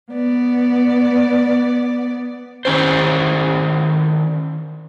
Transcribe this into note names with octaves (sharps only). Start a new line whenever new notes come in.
B3 D5
D#3 C#4 E4 C5